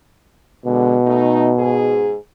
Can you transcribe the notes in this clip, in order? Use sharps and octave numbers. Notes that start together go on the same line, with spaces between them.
B2 D3 G#3
A3 D#4
G#2 G#4